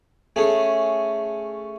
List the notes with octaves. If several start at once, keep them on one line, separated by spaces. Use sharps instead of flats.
A3 C#4 G#4